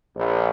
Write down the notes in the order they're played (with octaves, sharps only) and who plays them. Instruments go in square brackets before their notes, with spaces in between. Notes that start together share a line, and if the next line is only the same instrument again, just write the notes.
[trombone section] A#1